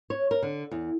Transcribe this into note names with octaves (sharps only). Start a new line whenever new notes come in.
C#5
A#4
D3
E2